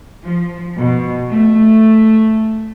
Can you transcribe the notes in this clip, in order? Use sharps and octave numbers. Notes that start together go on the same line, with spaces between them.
F3
B2
A3